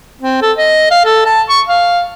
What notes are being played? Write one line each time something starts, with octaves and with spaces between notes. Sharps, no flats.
C4
A4
D#5
F5
A4
A5
C#6
F5